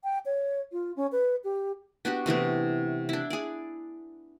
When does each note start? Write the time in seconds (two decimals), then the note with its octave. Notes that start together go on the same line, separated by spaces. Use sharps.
0.04 G5
0.26 C#5
0.72 F4
0.96 C#4
1.12 B4
1.44 G4
2.05 B3 D4 F#4 G4
2.26 C3 E3 A3 B3
3.09 D4 E4
3.30 G#4 D5